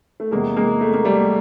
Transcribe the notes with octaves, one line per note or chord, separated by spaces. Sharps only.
A3
E2 C3 E3 G#3 A#3
G#3 A#3
A3
A#3
G3 A3